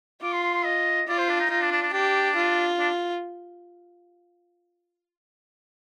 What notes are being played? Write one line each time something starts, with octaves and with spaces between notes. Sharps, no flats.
F4 D6
C6
C6
C6
D#5
F4 D5
C5
D4
D#4
D#4 F4
D4
D4
D4
D4 G4
F4
D4